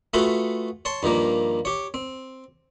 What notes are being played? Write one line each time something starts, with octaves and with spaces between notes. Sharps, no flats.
A3 F4 F#4 G#4 A4 B4
C#5 A5 C6
G2 D#3 F3 A#3
G4 C#5
C4